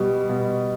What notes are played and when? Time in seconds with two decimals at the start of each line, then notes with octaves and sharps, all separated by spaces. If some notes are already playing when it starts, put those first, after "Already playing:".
Already playing: B2 G3
0.29 B2